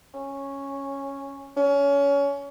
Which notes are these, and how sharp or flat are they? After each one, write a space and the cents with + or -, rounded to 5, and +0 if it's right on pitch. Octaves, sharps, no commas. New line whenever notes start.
C#4 -5
C#4 +25